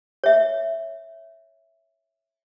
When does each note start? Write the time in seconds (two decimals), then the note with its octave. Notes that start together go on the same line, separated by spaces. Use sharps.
0.24 C#5 E5